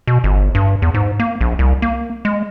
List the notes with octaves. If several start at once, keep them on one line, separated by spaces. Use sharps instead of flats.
B2
G1
G2
E2
G#2
A#3
A#1
C2
A#3
G#3